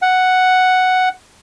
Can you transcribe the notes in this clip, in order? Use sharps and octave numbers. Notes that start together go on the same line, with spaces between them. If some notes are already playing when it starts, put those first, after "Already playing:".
F#5